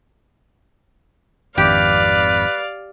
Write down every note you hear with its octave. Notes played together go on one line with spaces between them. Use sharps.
G#1 F2 D#3 G4 B4 D5 F5